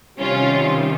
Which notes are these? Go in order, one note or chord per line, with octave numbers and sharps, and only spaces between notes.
C3 D#3 G3 C#4 F4